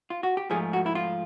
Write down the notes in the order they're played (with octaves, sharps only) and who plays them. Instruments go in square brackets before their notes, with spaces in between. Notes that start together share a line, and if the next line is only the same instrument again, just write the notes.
[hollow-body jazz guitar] F4
F#4
G4
G#2 F3 A3 G#4
F#4
E4
F4